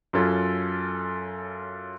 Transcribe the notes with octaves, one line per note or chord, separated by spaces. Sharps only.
F#2 C#4 F4 A4 G#6